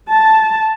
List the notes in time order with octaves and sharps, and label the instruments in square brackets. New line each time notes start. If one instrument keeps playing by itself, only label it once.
[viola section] A5